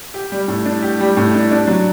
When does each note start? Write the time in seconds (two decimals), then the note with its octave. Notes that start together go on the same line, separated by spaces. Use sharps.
0.14 G4
0.32 G3
0.48 A2
0.66 D4
0.83 G4
1.00 G3
1.17 A2
1.34 D4
1.51 D4
1.68 F#3